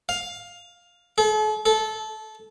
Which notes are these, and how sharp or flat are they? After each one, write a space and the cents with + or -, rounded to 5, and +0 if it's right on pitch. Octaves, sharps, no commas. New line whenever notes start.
F5 +10
A4 -45
A4 -20